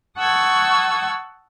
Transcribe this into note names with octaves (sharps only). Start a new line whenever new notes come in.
F#5 A5 C#6 D#6 E6 G#6